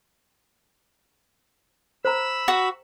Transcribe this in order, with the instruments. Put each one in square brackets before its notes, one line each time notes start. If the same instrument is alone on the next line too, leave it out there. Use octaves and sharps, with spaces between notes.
[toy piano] C5 A#5 [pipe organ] B5 E6
[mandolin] F#4